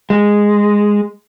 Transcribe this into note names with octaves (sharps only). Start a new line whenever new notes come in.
G#3